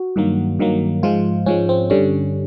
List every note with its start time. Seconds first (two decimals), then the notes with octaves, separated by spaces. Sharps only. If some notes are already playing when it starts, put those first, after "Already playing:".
Already playing: F#4
0.16 G2 D#3 F#3 A#3
0.59 G2 D#3 F#3 A#3
1.03 G#2 F3 G#3 F4
1.46 G#2 F3 G#3 C#4
1.69 C4
1.90 G2 D3 G3 C#4